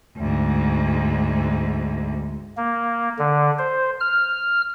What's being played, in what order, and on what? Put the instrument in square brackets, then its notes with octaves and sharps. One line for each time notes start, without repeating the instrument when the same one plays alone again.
[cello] D2 G#2
[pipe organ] A#3
D3
C5
F6